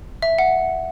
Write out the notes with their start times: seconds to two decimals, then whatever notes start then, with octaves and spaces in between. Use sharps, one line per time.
0.22 E5
0.38 F#5